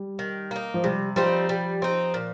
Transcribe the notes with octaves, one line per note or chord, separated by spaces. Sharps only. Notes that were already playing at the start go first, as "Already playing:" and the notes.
Already playing: G3
D#3
A#3 D#4
F3
C3 G3
F3 G3 C4 D#4
G3
C4 D#4
A#2